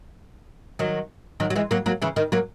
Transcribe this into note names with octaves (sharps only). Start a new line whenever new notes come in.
D#3 F#3
D#3 F#3
F#3
E3 G#3
F#3 A#3
F#3 A#3
C#3 E3
D#3
F#3 A#3